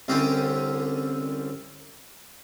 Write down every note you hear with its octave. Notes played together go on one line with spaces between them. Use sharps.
C2 D3 C4 C#4 G4